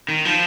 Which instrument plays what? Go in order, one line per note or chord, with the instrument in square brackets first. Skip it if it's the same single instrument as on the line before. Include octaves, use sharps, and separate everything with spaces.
[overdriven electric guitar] D#3
F3